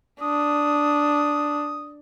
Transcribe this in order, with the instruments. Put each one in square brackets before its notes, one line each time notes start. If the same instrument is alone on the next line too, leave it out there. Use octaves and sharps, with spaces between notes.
[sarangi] D4 [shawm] D#6